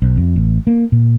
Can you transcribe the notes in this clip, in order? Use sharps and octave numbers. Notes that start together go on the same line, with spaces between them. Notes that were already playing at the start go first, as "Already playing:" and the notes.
B1
F2
A1
A#3
A#2